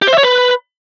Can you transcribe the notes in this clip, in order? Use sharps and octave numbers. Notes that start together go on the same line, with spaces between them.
G4
C5
E5
C#5
B4